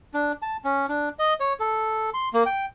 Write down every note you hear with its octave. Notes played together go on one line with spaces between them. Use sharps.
D4
A5
C#4
D4
D#5
C#5
A4
C6
A#3
G5